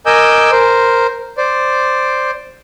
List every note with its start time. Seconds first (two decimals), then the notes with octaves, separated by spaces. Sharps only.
0.06 A#4 D#5 G#5 D6 E6 G6
0.51 A#4 C5
1.38 C5 D5